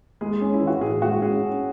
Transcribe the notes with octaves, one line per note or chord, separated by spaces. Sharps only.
G#3 G#4
C#4
E4
E3
F#4
A2 G#4
G#3 F#4
C#4 G#4
C#4